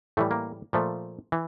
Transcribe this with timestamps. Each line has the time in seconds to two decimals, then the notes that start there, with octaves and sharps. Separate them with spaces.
0.17 A2 E3 G3 A3
0.31 A#3
0.73 A#2 F3 A3
1.32 E3